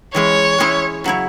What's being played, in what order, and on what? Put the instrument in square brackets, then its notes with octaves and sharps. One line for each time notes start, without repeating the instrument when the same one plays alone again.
[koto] E3 G#3 C#4 G#4 [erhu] C#5
[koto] G#3 C#4 E4 G#4
C#3 F#3 E4 C#5